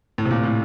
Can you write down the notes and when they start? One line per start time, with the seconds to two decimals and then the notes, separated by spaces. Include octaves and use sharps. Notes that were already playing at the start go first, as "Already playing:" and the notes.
0.18 A2
0.25 C3
0.31 A#2
0.43 A2